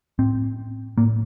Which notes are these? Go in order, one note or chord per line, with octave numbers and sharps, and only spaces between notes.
A2 C4
A2 A#3